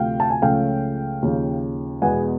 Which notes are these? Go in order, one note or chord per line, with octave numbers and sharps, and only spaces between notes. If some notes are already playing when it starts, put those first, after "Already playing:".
Already playing: D2 C3 F3 A3 F5 G5
A5
G#5
C#2 C#3 F3 A3 C#4 F5 G5
D#2 C#3 F3
E2 B2 G#3 B3 F#5 G#5